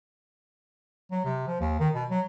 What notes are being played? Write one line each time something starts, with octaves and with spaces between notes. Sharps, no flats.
F#3
C3
F3
D#2
D#3
B2
F#3